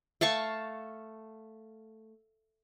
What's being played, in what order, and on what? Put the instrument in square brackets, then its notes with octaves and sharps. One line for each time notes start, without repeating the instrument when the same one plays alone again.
[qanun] A3 F5 A5 C#6